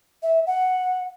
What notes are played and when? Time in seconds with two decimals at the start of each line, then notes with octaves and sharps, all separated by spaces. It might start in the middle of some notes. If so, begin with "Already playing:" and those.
0.23 E5
0.47 F#5